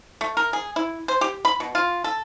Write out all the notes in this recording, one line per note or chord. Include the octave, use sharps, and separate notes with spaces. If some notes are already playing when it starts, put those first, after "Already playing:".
A3
A#4
G#4
E4
C5
G4
B5
B2
F4
A4